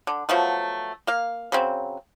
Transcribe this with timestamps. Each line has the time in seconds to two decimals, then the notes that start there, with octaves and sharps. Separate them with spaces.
0.07 D3
0.29 F3 F#3 A3 B3
1.07 A#3 F5
1.52 C#3 F#3 C4